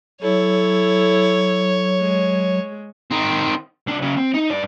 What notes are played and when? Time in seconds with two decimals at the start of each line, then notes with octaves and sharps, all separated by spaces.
0.22 F#3 E4 A4 C#5
2.01 G#3
3.11 D#3 C4
3.87 C2 D4
4.02 C#3 F#3
4.17 C4
4.34 D#4
4.50 G2 D5